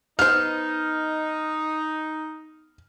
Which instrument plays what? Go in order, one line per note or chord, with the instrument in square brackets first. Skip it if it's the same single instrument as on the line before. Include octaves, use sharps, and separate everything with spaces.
[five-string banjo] B3 C5 [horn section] D#4 [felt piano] F6